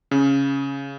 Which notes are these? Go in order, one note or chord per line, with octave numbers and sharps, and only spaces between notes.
C#3